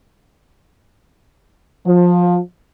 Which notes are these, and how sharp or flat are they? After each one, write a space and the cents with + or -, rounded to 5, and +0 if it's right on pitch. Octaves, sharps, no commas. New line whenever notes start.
F3 +20